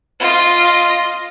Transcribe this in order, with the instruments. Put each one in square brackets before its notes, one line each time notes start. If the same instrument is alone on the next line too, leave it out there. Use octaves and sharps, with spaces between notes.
[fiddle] F4 D#5